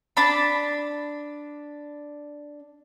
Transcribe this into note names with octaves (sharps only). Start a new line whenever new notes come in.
D4 A5 B5